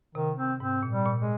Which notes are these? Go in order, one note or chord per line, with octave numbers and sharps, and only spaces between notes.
C3 D#3
C4
G#2 C4
A#2
G3
A#2
G#3